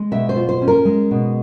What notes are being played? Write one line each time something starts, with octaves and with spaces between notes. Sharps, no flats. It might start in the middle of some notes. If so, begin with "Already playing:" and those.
Already playing: G#3
B2 E5
C5
F4
C5
C#4
A#4
G#3
B2